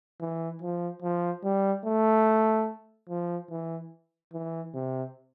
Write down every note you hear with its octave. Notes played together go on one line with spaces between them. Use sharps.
E3
F3
F3
G3
A3
F3
E3
E3
C3